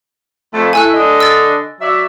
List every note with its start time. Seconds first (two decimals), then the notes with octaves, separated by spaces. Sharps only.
0.53 F2 A3
0.73 A3 E4 G#5 E6 F#6
0.94 D3 D4 D#5
1.20 E6 A6
1.81 F#3 D5 E5